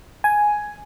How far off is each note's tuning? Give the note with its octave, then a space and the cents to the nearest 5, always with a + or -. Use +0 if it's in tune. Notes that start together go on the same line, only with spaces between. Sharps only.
G#5 +5